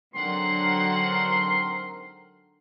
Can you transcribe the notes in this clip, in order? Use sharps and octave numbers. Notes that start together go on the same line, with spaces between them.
G#2 D3 F#3 C4 A#4 F#5 C6